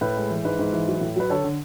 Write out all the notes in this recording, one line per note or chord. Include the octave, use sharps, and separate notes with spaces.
A2 B4
G#3
E3
G#2 B4
G#2
E3
F#3
A2
F#3 B4
D3 A4 C#5
D3